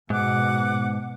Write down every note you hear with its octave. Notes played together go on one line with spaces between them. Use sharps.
G#2 B2 F#5 D6 F#6